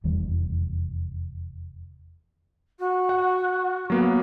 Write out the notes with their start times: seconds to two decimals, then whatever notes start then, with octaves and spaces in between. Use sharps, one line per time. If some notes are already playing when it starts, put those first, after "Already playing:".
0.04 F1 E2 D#3 G3
2.79 F#4
3.09 F#5
3.90 F#3 A#3 B3